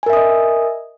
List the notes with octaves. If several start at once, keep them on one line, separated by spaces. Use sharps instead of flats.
A#4 D#5 E5 G#5 D#6